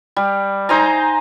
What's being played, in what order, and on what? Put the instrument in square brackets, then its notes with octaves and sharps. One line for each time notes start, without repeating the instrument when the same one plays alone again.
[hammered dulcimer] G3
D#4 C5 G#5 A#5